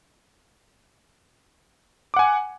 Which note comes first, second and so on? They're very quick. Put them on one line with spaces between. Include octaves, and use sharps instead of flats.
D6 F#5 G#5